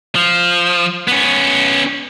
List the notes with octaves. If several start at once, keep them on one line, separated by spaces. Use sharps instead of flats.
F3
B3 C#4